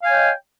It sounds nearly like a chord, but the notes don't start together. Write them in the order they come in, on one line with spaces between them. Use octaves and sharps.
F5 G#5 C#5 G5 D#5